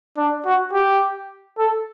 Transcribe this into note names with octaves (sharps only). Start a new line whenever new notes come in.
D4
F#4
G4
A4